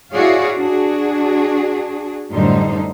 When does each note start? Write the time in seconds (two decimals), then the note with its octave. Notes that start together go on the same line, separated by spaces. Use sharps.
0.11 E4 F#4 G#4 C#5 D5 F5
0.57 D4 F#4 G#4
2.31 F#2 A2 D3 G3 D#4 C5